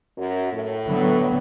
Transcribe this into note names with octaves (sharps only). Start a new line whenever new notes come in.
F#2
A2
D3 F#3 B3